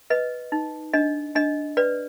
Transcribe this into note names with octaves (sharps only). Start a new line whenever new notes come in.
B4 D#5
D#4
D4 D#5
D4 D#5
B4 D5